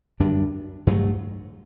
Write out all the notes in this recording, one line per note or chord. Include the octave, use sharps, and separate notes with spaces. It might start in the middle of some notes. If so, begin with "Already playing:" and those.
F#2 D3 G3 D4
G2 F#3 A3